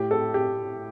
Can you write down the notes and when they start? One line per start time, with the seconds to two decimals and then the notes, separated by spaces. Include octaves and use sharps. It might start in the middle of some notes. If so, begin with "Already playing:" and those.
Already playing: A2 G4
0.11 A4
0.34 G4